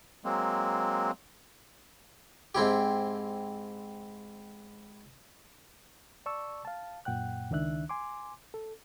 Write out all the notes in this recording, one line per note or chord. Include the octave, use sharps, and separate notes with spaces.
F#3 G#3 A#3 C4
G#2 C4 E4 G4
D5 A5 C#6 E6
F5 A5
F#2 A#2 F#5 G5 F#6
C#2 D#3 D4 E5 F#6
G#5 C6 D6
A4